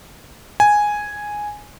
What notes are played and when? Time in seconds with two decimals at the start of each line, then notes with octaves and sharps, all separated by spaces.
0.60 G#5